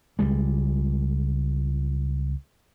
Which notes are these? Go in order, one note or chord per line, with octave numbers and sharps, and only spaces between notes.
C#2 G3 G#3